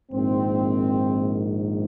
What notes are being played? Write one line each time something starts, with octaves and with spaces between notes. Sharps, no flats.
A#1 G#2 D#3 C4